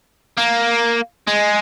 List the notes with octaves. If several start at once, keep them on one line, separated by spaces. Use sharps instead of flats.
A#3
G#3